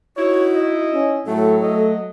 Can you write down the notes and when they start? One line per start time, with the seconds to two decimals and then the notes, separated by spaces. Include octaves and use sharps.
0.17 D#4 E4 F#4 C#5
0.55 D#5
0.94 C#4
1.27 A2 F#3 A3 A4
1.63 A3 D#5